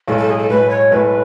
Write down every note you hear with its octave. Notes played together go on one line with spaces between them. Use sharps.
B1 A2 G#3 A4
A4
G#4
A4
B1 A2 G#3 B4
C#5
B1 A2 G#3 B4